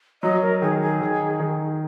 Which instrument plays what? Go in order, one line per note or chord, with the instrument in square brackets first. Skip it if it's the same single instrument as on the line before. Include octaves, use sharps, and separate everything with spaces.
[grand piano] F#3 [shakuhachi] D#5
[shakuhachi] A#4
[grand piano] D#3 [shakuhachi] G#4
[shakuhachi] G#4
[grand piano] D#3
D#3